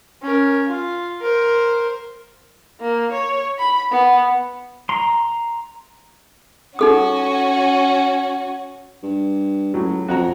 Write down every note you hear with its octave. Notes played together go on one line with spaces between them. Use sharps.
C#4 A#4
F4
A#4 C5
A#3
C#5
B5
B3
A#5 C6
C#4 D#4 F#4 A4 D#6
G2
C#2 A2 F#3
F2 F#4 A#5